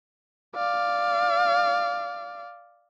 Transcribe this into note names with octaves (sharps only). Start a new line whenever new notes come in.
D5 F5